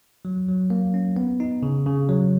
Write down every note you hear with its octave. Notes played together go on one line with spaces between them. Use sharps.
F#3
F#3
A#3
C#4
B3
D#4
C#3
C#3
F#3